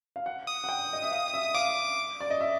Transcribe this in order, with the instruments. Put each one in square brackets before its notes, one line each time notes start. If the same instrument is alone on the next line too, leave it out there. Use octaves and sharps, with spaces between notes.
[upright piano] F5
F#5
[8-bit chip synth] D#6
[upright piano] F#5
G5
D#5
E5
F5
E5
[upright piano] F5 [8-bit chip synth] D6
[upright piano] D5
D#5
E5